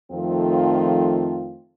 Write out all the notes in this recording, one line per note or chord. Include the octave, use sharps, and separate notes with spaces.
F2 D#3 F3 A3 C4 F4